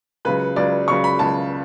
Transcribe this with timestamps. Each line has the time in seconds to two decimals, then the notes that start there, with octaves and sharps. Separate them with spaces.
0.25 C#2 C#3 F#3 B4
0.56 C#2 C#3 F#3 D5
0.88 C#2 C#3 F#3 C#6
1.04 B5
1.19 C#2 C#3 F#3 A5